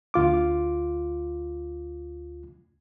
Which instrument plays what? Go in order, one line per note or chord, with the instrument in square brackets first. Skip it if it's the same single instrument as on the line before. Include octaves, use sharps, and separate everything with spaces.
[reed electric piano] D2 F4 D6